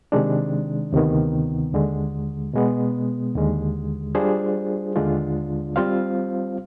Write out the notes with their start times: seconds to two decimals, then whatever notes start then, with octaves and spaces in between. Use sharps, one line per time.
0.12 C3 D#3 G#3 D4
0.92 D2 C3 D#3 B3
1.73 D#2 D3 G#3
2.53 B2 G#3 B3
3.34 D#2 D3 G#3
4.15 G3 D4 F4 G#4 C5
4.96 D#2 D3 G#3 D4 F4
5.76 G3 C4 F4 C5 F5